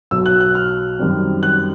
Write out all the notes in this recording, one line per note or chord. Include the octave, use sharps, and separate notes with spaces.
B1 B2 F#3 E6
F#6
F#6
F6
F#2 D#3 G3 C4
F#6